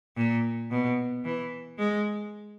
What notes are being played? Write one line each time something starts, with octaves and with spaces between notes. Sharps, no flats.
A#2
B2
E3
G#3